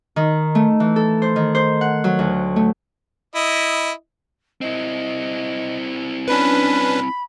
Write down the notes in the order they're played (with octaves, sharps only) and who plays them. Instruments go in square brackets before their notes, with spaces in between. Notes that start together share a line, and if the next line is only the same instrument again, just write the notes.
[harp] D#3
A3
E3
A4
C5
D#3
C5
F#5
F#3
D2
A3
[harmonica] E4 D#5
[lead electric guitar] C4 E4 [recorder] D#5
[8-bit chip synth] C#4 D4 B4 [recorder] B5